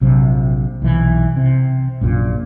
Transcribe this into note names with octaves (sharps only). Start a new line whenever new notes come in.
A#1 C3 F#3
B1 E3
C3
A#1 F#2 A#2